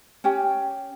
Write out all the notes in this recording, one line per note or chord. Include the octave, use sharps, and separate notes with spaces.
C#4 G4